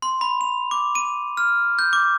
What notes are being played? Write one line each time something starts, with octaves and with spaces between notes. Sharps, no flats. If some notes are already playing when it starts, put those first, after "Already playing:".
C6
B5
F7
D6
D#7
F6
G6
D6